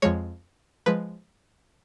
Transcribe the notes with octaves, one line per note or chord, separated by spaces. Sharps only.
F2 F3 G#3 C#5
F3 G#3 B4